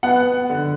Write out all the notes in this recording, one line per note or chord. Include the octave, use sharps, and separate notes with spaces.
B3 F#5
D3